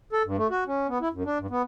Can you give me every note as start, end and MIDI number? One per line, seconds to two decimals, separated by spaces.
0.13 0.23 69
0.25 0.37 43
0.38 0.47 57
0.50 0.64 66
0.67 0.87 61
0.88 0.98 59
1.01 1.08 64
1.13 1.23 42
1.25 1.38 62
1.39 1.47 43
1.50 1.62 59